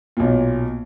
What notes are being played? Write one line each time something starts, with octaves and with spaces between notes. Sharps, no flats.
B1 A#2